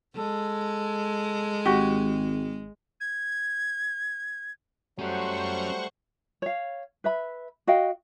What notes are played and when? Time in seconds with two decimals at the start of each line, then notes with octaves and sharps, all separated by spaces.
0.16 G#3 A4
1.65 G#1 F#4 G4
3.00 G#6
4.99 F#3 G3 A3 C#4 F#4 C5 F#5 C#6
6.42 C#5 F5
7.04 B4 E5 B5
7.67 F#4 D#5 F5 G5